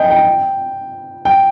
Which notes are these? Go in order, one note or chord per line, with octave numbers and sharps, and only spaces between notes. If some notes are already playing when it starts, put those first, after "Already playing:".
Already playing: D#5 G5 G#5
G5
G5